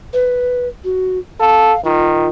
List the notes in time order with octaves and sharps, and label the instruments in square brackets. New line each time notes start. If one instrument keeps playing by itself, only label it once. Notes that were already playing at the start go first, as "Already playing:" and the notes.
[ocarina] B4
F#4
[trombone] A4 [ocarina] F5
[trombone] D#3 [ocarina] F4